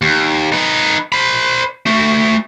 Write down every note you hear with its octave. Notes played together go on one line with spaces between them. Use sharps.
D#2
D#4 B4
C5 B5
A3 F#4